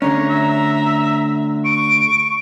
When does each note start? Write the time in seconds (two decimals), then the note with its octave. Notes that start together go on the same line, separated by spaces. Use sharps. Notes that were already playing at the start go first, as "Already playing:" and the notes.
0.02 D2 D3 C#4 C#5 A#5
0.30 E5
1.65 C#6 D7